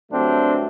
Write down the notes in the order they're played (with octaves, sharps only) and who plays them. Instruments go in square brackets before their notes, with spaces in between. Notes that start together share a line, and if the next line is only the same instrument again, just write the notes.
[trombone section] G2 D3 F#3 A3 C4 D4